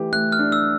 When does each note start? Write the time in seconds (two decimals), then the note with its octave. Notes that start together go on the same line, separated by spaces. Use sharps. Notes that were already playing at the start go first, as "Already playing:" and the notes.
Already playing: E3 A3 G4
0.12 A3 F#6
0.32 F6
0.39 D4
0.52 E6